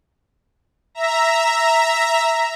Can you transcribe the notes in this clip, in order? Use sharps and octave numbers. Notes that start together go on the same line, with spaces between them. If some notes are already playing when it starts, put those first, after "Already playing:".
E5 A#5